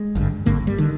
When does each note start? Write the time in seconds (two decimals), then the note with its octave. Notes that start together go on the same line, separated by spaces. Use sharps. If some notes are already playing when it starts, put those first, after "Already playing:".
Already playing: G#3
0.15 G#1 G2 D3
0.46 G#1 G2 D3 A#3
0.67 G3
0.78 D3 D#3